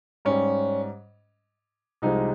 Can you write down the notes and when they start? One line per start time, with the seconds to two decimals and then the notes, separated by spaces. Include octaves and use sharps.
0.25 G#2 G3 C#4
2.02 C2 C3 F3 G#3 D#4